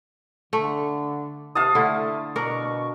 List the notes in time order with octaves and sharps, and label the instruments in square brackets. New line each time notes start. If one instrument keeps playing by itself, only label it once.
[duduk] D3 [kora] A3
[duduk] C3 [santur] F5 A5 D#6
[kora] D3 E4 [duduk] A3
[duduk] B2 [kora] D4 A#4 [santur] C#6